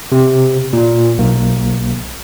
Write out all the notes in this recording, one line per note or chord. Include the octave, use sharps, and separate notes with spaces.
C3
A#2
B1 A#3